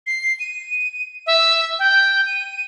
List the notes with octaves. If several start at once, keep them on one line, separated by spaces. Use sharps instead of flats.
C7
D#7
E5
G5
D#7